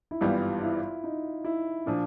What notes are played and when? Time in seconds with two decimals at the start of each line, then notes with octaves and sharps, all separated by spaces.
0.11 E4
0.21 G#1 G2 E3 G3 B3 F4
0.62 E4
1.04 D#4
1.44 E4
1.86 A#2 F3 D4